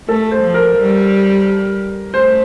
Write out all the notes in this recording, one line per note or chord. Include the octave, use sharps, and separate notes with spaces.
A3 A4
C5
F3
A#4
G3
A3 C5